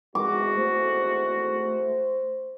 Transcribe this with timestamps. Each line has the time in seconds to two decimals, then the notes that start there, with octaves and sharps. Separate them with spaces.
0.15 G#1 E2 G#3 F#4 D6
0.57 A3 C5